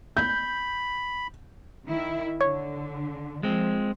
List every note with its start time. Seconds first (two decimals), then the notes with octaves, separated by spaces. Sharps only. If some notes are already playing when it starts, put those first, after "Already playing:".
0.17 B5 G6
1.86 D#3 E4
2.41 D3 C#5
3.43 F3 G#3 C4